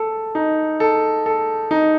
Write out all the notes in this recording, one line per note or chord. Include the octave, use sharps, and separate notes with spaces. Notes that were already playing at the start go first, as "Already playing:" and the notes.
Already playing: A4
D#4
A4
A4
D#4